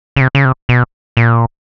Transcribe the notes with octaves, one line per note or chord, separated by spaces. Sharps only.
C#3
C3
C#3
C3
B2
A#2